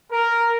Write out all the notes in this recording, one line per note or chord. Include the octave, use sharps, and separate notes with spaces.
A#4